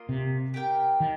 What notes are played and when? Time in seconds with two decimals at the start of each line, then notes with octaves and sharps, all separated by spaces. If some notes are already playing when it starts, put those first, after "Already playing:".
Already playing: A#3 F4 D#5
0.09 C3
0.54 G4 A#4 G5
1.00 D#3